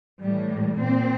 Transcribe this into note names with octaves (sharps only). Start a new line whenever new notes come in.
A2 E3 G3
A#2 C4